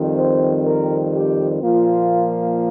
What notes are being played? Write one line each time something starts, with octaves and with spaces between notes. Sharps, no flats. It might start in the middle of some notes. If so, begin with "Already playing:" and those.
Already playing: F2 D#3 G3 C4
C5
A#4
G4
A#2 F3 A#3 F4